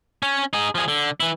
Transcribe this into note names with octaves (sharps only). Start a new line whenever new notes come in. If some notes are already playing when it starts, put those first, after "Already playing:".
C#4 C#5
D#4 G#4
F3 G#4
D3
E3 E4